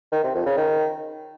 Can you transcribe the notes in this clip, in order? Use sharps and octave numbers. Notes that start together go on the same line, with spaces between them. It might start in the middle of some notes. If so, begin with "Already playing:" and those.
D#3
C3
F2
C#3
D#3